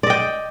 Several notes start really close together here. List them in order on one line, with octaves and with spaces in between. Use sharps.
D5 D#5 G5